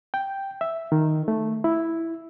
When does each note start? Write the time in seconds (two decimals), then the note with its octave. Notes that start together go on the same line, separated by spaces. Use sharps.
0.14 G5
0.61 E5
0.92 D#3
1.28 A3
1.64 E4